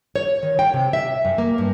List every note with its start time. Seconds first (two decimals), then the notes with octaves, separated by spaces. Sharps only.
0.16 C#5
0.43 D#3
0.59 G5
0.74 C3
0.93 E5
1.25 F#2
1.38 A#3
1.58 G2